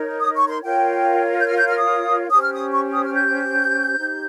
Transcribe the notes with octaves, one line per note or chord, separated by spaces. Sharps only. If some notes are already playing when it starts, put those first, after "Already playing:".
Already playing: D#4 A#4 C#5
D#6
C#6
C6
F4 A#4 C#5 G5
G6
F6
G6
F6
D#6
C#4 G4 C5 D#6
F6
D#6
C#6
D#6
F6
G6
D#4 G4 C5